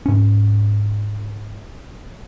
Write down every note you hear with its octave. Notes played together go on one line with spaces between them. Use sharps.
G#2 C#4